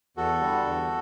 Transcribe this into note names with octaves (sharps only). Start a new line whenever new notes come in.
E2 F#4 A4
D3 G3
E2